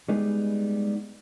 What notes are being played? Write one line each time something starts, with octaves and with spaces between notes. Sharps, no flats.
G3 G#3 B3 D#4 G4 G#4